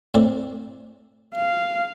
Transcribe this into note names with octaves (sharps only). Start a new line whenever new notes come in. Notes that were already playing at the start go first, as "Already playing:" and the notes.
A2 C4 D5
F5